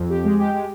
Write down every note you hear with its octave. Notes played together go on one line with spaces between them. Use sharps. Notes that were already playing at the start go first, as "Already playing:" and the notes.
Already playing: F2
G4
G#3
G4
G#3